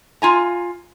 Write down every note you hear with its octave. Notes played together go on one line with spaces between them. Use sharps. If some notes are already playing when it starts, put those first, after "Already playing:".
F4 G#5 A#5